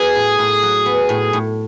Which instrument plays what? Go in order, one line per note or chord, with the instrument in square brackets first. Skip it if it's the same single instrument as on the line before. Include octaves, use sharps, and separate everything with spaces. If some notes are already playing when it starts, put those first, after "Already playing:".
Already playing: [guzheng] F#3 B3 [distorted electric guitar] G#4
[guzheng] A2
A2
F#3
B3
A2
A2